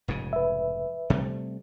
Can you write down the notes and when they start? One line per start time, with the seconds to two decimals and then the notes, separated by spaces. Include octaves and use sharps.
0.08 F1 G#2 C#3
0.33 B4 E5
1.10 C3 G3 A3